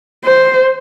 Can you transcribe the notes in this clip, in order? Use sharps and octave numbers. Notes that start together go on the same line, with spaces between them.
C5